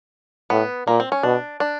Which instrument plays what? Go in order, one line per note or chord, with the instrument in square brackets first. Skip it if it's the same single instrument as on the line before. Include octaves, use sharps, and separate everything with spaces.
[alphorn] A2 [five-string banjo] B3
[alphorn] A#2 [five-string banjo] A#3
[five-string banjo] C4
C#4
[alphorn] B2 [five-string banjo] D4
[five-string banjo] D4